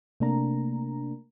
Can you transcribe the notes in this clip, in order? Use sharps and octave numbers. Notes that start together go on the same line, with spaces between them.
C3 A3 A#3 D4 A#4 A#5